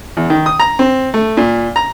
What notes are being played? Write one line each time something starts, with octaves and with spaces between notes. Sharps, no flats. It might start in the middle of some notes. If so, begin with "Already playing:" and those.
E2
D#3
D#6
A#5
C4
A3
A#2
A#5